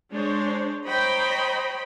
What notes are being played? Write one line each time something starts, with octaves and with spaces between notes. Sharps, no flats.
G#3 D4 C5 C#5
C5 C#5 D#5 G5 A#5 B5